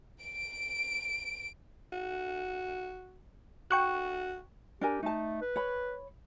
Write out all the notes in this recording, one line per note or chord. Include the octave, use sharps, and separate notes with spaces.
D7
F#4
F#4 G5 C#6 F#6
D4 G4 A#4 G#5
A3 D#4 A5
B4
C#5 B5